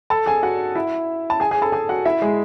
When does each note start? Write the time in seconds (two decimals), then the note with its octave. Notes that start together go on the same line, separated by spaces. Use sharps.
0.10 A4 A5
0.26 G#4 G#5
0.43 F#4 F#5
0.75 E4 E5
1.30 A5
1.40 G#4 G#5
1.51 G#4 G#5
1.62 A4 A5
1.72 G#4 G#5
1.89 F#4 F#5
2.05 E4 E5
2.22 G#3 G#4